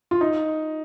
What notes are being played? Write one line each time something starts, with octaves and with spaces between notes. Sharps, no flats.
F4
D#4